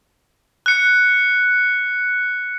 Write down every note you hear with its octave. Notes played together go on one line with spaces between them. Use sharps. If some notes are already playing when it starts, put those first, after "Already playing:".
F#6 C#7